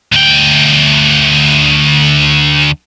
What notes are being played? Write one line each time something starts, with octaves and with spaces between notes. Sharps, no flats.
D2 G5